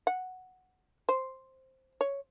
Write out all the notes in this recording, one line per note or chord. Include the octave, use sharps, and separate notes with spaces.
F#5
C5
C#5